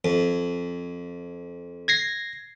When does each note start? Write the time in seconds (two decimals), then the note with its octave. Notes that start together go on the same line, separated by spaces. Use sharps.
0.05 F2
1.88 G#6 A#6 C7